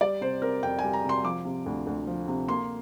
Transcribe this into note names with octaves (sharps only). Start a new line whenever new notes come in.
G3 D5
C3 C5
C4 A#4
F2 G5
G3 G#5
A#5
C3 C6
F3 D6
C3
D2
D2
F3
C3
A#3 C6